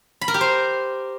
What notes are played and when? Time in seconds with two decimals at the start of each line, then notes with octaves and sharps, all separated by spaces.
0.21 B5
0.28 A#4
0.34 G4
0.41 C5